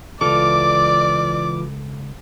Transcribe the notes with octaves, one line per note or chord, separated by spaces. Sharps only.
C#2 E3 F4 A4 D5 D6